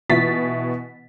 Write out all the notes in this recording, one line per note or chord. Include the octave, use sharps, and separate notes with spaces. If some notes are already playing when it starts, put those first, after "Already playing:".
B2 E3 A6 B6